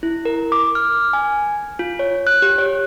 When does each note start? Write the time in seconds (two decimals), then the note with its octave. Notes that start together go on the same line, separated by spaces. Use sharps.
0.03 E4
0.25 A#4
0.52 D6
0.75 F6
1.13 G#5
1.79 F4
1.99 C#5
2.27 F#6
2.42 G4
2.58 C#5